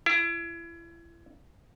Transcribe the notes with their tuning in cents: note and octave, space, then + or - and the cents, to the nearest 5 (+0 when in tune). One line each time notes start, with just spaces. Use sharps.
E4 +35